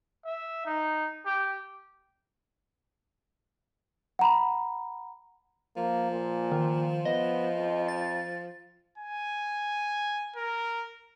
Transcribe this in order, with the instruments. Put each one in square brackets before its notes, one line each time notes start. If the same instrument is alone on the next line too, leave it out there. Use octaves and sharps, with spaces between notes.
[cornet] E5
D#4
G4
[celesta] F#5 A#5 B5
[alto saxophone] F3 [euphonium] A#3
[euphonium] A#2
[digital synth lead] D#3
[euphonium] B3 [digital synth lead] D#5
[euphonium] F2
[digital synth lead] A6
[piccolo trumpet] G#5
A#4